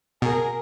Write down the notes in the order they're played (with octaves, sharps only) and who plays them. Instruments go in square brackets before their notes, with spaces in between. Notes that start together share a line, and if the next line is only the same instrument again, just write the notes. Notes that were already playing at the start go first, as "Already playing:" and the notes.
[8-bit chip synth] B2 [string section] G#4 A#4